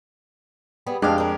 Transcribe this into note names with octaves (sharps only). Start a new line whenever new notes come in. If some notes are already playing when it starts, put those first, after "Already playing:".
G3 B3 G#4
F2 G#3 D4 G4 F5
C4 A#4